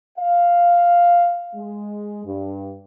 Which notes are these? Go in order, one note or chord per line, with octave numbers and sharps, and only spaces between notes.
F5
G#3
G2